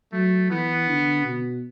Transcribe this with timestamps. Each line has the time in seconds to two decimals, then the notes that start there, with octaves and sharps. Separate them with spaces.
0.13 F#3 A3
0.50 E3 B3
0.88 D3
1.24 B2